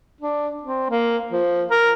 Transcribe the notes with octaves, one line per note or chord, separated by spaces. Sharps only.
D4
C4
A#3
F3
A#4